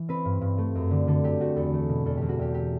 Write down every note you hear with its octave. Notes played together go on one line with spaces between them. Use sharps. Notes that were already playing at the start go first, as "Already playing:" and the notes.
Already playing: E3
C4 B4
G2
G2
A3
F#2
D3
D3 A4
F#3 G4
A3 F#4
E2 A4
A3
B2
E2 A4
E2 G4
F#4
E2 G4
F#3 G4